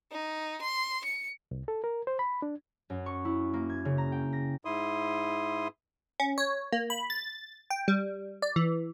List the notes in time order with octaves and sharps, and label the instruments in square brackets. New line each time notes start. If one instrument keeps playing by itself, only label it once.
[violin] D#4
C6
C#7
[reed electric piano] C2
A4
A#4
C5
B5
D4
[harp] F#2
C#6
E4
A#3
G#6
C#3
A#5
G5
A#6
[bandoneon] G#2 E4 C6 D#6
[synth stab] C#4
C#5
A#3
B5
A6
G5
G3
D5
E3